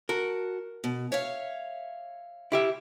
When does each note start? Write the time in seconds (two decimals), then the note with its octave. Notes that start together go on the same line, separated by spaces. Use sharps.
0.09 F#4 A#4 A5
0.84 B2
1.12 C#5 E5 F5
2.52 E4 G4 E5